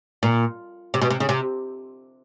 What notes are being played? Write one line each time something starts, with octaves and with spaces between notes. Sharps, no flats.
A#2
C3
B2
C3
C#3
C3